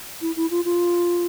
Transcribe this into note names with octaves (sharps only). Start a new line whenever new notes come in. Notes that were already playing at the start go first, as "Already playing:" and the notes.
E4
E4
F4
F4